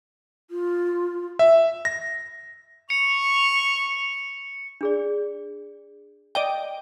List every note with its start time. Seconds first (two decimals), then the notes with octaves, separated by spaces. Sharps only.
0.50 F4
1.39 E5
1.85 A#6
2.90 C#6 C#7 F7
4.81 D4 G#4 D5
6.35 D5 D#5 G5